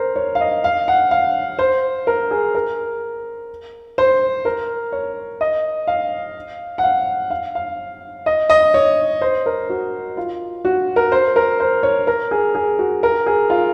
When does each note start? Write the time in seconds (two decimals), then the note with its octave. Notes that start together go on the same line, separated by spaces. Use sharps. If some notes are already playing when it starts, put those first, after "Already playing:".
Already playing: A#4 C5
0.16 C#5
0.35 F5
0.41 D#5
0.64 F5
0.88 F#5
1.11 F5
1.59 C5
2.07 A#4
2.31 G#4
2.55 A#4
3.98 C5
4.45 A#4
4.92 C#5
5.41 D#5
5.87 F5
6.78 F#5
6.84 F5
7.30 F5
7.55 F5
8.26 D#5
8.50 D#5
8.74 C#5
9.21 C5
9.46 A#4
9.70 F#4
10.17 F4
10.65 F#4
10.96 A#4
11.12 C5
11.36 A#4
11.60 C5
11.83 C#5
12.07 A#4
12.31 G#4
12.55 G#4
12.79 F#4
13.03 A#4
13.26 G#4
13.50 F4